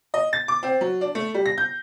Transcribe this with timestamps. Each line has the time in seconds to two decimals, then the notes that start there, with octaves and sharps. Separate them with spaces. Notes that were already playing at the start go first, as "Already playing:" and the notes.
0.14 D#5
0.33 A6
0.48 D6
0.63 C4
0.81 F#3
1.01 D4
1.15 A3
1.34 G3
1.46 A#6
1.58 G6